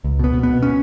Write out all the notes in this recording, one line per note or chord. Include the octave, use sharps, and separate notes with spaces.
C#2
B2 B3
B2
B2 B3
C#4